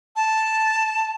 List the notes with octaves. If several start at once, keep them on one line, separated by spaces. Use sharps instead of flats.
A5